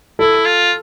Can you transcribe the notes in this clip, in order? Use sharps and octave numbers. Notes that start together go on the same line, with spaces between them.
E4 A4
F4